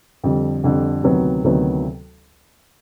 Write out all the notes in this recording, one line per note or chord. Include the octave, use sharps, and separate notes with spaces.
F2 D3 G3
F2 D3 G3
D2 C3 D#3 F#3 B3
D2 C3 D#3 F#3 B3